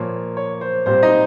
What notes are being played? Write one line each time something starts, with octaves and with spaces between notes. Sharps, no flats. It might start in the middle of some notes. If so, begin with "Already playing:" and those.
Already playing: A#2 F3 A#3 C#5
C#5
C5
A#2 G3 C4 C5
D#4 D#5